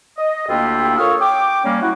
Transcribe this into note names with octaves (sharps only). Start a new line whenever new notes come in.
D#5
D2 A#3 D4 E4 F4 G4
F4 A4 A#4 C#5 F5 D#6
G5 D6
G3 A#3 C#4
E4 F#4